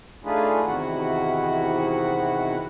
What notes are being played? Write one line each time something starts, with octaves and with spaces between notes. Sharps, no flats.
A3 D4 D#4 F4 G#4 B4
E2 C3 D#3 E4 F#4 F#5